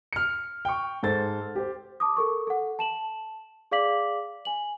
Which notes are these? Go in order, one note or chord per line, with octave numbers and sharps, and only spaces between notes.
F6 C#7
G5 C#6
G#2 A4 C5 A6
G4 C5
A5 D6 D#6
A4 A#4 C#6
A4 F#5
A5 E7 F#7
G#4 D5 F5 D6 B6 F#7
G#5 F#7